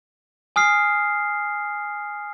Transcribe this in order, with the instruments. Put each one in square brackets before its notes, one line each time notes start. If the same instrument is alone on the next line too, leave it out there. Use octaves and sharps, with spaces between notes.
[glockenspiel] G#5 D#6 F6 C7